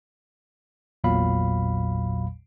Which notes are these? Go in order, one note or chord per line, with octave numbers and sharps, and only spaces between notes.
A1 E2 A#2 F#3 F5 B5